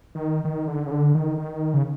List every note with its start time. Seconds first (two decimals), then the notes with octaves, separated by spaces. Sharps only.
0.15 D#3
0.45 D#3
0.68 D3
0.87 C#3
0.91 D3
1.15 D#3
1.38 D#3
1.74 C#3